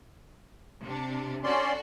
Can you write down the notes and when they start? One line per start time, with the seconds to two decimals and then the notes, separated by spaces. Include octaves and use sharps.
0.83 C3 D4
1.44 C#4 D4 F#4 A4 D5 C6